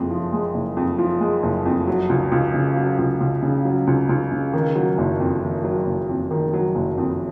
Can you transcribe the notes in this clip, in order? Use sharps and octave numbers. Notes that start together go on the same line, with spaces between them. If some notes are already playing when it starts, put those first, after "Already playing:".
Already playing: F#1 F2 G#3
F3
G#3
F#1
F2
F3
G#3
F#1
F2
F#3
C#2
C#2
C#3
F#3
C#2
C#2
C#3
F#3
C#2
C#2
C#3
D#3
F#3
F#1
F2
D#3
F#3
F#1
F2
D#3
F#3
F#1
F2